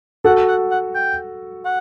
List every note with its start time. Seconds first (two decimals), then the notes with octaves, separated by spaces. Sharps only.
0.24 F#4 A4 F#5
0.48 F#5
0.71 F#5
0.95 G5
1.65 F#5